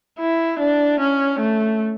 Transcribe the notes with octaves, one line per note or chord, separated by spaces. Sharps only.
E4
D4
C#4
A3